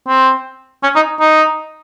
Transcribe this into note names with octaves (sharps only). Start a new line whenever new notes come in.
C4
C#4
D#4
D#4